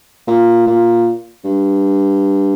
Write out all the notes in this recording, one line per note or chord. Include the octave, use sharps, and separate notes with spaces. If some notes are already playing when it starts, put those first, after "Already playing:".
A#2
A#2
G2